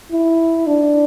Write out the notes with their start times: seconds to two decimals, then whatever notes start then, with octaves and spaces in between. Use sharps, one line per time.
0.12 E4
0.67 D4